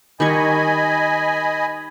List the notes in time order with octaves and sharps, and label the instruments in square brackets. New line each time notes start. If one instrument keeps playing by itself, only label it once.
[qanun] D#3 G3 C#6 [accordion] D#5 G#5 B5